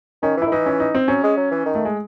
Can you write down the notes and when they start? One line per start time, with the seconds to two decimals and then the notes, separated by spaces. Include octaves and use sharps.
0.23 D#3 C#4
0.37 E3 E4
0.47 D#3
0.51 E3 D#4
0.66 C#4
0.80 D#4
0.95 C4
1.08 F#3 C#4
1.23 G#3
1.37 F#3
1.51 E3
1.66 D#3
1.75 A3
1.85 G#3